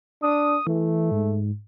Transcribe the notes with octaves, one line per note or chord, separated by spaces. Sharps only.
D4 D#6
E3 A3
G#2